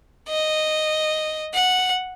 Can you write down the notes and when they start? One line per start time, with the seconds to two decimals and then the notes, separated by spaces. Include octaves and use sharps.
0.29 D#5
1.54 F#5